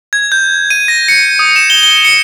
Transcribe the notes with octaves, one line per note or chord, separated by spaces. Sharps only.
G#6
G6
D#7
A#6
C#7
D#6
E7
G7
G7
C#7